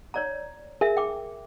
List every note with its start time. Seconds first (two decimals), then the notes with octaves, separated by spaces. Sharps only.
0.14 C#5 D5 A#5
0.81 G#4 A#4 E5
0.97 G5 D6